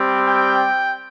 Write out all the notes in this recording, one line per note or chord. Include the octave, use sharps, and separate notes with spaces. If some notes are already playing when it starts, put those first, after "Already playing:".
Already playing: G3 C4 G4
G5